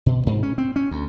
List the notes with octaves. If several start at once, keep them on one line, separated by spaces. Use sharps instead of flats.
B2
G#2
C#4
C4
C#4
D2